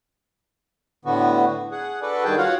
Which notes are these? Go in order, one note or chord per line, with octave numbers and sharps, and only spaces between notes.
A2 D3 B3 F#4
G#4 F#5
D4 F#4 A4 B4 D5
G2 D#3 G#4 G5 A5
F4 F#4 C#5 F5 F#5